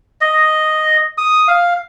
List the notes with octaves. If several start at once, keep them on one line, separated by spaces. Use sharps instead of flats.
D#5
D#6
F5